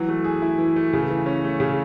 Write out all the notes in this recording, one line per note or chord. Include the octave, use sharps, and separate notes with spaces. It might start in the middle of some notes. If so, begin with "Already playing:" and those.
Already playing: E3 F#3
A3
G#4
E4
E3
A3
C#3
E3
C#4
A3
C#3